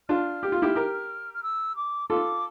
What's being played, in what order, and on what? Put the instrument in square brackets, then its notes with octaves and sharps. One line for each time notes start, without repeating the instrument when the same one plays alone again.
[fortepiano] D4 F4 [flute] F6
[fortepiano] G4
F4
E4 G4
G4 A#4
[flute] F6
E6
D6
[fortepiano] F4 A4 [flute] D6